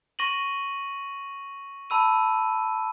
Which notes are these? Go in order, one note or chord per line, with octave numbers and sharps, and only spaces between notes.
C#6 A#6 D#7 F#7
A5 B5 E6 D#7